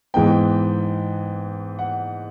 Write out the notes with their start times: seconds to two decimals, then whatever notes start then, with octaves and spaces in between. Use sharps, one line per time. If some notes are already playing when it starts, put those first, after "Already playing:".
0.14 G#2 E3 G#3 B3 G5
1.79 F#5